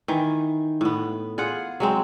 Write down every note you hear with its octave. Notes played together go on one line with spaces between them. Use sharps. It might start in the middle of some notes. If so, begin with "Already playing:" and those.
D#3 E3
A2 B3
F4 G#4 F#5
F#3 G#3 C4